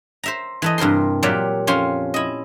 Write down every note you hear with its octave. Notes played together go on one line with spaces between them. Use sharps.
C5 E5 A#5
E3 A4 D#5
G2 C3 A#4 C5 C6
A#2 F#3 G4 D5 E5 F5
F2 C#4 F4 C5 C6
E4 D#5